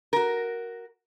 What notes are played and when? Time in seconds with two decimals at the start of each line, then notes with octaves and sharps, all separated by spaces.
0.13 F#4 A#4